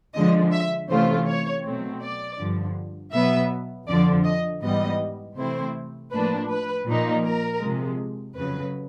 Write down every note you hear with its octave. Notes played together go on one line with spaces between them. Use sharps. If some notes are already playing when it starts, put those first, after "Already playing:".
D3 F3 G#3 D#5
E5
C3 E3 A3 C#4 F4 C5
C#5
B2 F#3 A3 C4
D5
G2 D3 F3
B2 F#3 B3 E5
F2 D3 F3 D5
D#5
G#2 E3 G3 B3 D#5
C3 E3 A3 C4 E4 C5
A2 F3 A#3 D4 B4
B4
A#2 F3 A#3 D#4
A#4
C3 F3 G#3
F2 C#3 F#3 B4